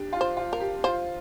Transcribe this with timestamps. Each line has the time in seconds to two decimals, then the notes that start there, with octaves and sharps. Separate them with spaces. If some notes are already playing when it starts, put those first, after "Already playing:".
Already playing: D4 G4
0.13 F4
0.21 C5
0.37 F4
0.53 A#4
0.60 G4
0.84 F4 C5